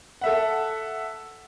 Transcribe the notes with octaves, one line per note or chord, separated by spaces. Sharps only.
A4 E5 F#5